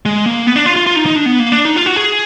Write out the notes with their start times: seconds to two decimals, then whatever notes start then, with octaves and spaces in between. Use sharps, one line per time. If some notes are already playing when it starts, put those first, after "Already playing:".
0.06 G#3
0.26 A#3
0.47 B3
0.56 D4
0.66 F4
0.76 F4
0.87 F4
0.96 D#4
1.06 D#4
1.16 D4
1.26 B3
1.40 A#3
1.52 D4
1.65 D#4
1.76 F4
1.86 F#4
1.96 G#4